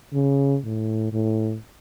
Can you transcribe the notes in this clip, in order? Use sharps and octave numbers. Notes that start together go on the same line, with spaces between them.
C#3
A2
A2